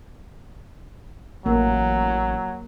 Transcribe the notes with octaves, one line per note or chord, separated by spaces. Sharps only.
A1 F#3 A#3